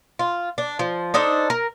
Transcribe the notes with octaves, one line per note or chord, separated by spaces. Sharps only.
F4
D4
F3
D4 D#4 A4 C5
A#4